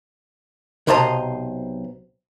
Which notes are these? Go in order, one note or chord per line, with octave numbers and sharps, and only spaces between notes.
B1 C3 C5 D#5 A5 A#5